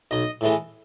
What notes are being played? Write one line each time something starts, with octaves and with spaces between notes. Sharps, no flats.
B1 D#5
A2 E3 G#3